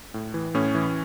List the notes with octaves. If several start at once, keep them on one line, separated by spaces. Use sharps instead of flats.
A2
E3
A2 C#4
E3